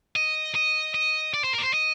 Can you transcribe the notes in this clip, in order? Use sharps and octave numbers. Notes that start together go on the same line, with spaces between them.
D#5
D#5
D#5
D5
C5
A#4
D5
C5
D#5